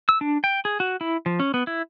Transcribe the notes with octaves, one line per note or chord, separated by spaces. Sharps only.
E6
D4
G5
G#4
F#4
E4
F3
C#4
B3
E4